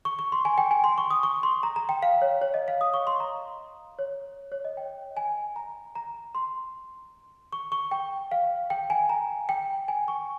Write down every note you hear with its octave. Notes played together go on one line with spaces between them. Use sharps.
C#6
C#6
C6
G#5
G5
G#5
C6
C#6
D#6
C#6
C6
A#5
A#5
G5
F5
C#5
C#5
D#5
F5
D#6
C#6
C6
A#5
C#5
C#5
D#5
G5
G#5
A#5
A#5
C6
C#6
C#6
G5
F5
G5
G#5
A#5
G5
G#5
C#6